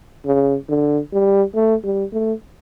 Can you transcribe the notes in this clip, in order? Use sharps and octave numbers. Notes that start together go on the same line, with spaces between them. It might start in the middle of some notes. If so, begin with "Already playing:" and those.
C#3
D3
G3
A3
G3
A3